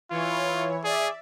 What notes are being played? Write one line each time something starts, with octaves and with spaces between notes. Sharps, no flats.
E3 E4 F4 C#5
G#4 D5 E5